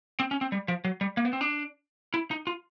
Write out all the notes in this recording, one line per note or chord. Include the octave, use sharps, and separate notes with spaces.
C4
C#4
C4
G3
F3
F#3
G3
A#3
B3
C4
D4
E4
D#4
F4